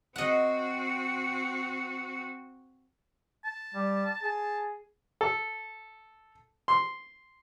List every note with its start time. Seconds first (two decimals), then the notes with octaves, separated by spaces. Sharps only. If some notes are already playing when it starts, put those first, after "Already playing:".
0.16 C4 F#4 D#5 F#5
3.44 A5
3.74 G3
4.23 G#4 A5
5.21 A4
6.68 C6